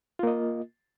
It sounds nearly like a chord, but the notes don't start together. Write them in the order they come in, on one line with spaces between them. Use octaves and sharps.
F4 A#3 D#5